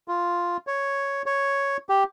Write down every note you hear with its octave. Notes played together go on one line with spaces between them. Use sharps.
F4
C#5
C#5
G4